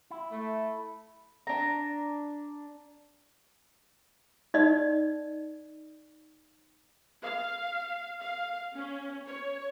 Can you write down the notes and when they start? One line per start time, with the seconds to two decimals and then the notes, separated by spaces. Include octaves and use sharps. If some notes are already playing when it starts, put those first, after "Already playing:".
0.10 E4
0.32 A3
1.47 D4 A#5
4.54 D#4 D5 D#5
7.23 F5
8.20 F5
8.73 C#4
9.28 C#5